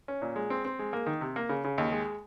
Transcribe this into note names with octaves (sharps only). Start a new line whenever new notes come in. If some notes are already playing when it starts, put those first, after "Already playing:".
C#4
A#2
G#3
C4
C4
G#3
A#3
D#3
C3
A#3
C#3
C#3
D#2
G#3